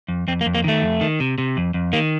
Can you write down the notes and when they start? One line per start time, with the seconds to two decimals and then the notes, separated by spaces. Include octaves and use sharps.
0.08 F2
0.28 F2 C4
0.41 A#3
0.46 F2
0.55 A#3
0.64 D#3 A3
0.82 F2
1.01 D#3
1.20 C3
1.38 C3
1.57 F2
1.74 F2
1.93 D#3 A#3